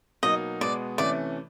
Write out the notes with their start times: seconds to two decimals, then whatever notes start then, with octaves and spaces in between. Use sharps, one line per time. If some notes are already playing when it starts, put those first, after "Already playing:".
0.23 B2 F#3 A#3 D#4 D#5
0.61 B2 G#3 B3 D5
0.98 C3 E3 A3 C#4 D5